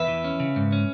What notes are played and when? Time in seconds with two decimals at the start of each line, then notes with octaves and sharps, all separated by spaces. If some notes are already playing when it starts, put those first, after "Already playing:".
Already playing: E2 B4 E5
0.08 E3
0.24 C#4
0.40 C#3
0.56 G#2
0.73 C#4